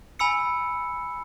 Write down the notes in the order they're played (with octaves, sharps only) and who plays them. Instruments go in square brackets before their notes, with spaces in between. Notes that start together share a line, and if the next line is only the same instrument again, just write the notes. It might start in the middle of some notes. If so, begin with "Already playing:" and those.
[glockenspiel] G#5 B5 E6 C#7